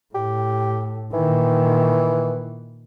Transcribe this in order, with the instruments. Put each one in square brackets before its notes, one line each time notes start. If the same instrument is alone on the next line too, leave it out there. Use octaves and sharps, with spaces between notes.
[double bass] A2 [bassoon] G4
[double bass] A#2 D#3 [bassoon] E3